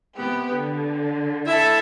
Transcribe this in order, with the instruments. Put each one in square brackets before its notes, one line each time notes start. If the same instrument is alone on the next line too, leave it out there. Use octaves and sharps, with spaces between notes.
[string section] C3 B3 G4
D3
[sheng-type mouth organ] E4 [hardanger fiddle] A4 E5